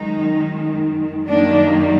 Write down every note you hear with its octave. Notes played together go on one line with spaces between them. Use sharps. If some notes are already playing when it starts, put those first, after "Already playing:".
Already playing: F#2 D#3 G#3 D#4
F#2 D#3 G3 A#3 D4